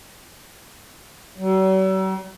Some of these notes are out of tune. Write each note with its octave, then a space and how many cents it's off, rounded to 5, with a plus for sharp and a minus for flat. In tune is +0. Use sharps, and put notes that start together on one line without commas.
F#3 +45